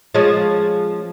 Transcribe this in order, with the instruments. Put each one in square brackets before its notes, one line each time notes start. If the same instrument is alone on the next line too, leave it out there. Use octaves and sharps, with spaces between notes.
[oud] F3 G#3 C#4